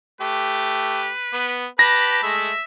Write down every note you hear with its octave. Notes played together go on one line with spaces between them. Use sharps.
A3 G4 B4
B3
G4 B4 A5 B5 A#6
G#3 A3 E5